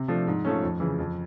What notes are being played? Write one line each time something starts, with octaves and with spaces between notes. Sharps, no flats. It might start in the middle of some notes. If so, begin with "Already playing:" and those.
Already playing: C3
F3 A3 D4
G#2
F3 A3 C#4
F2
C#3 E3
F2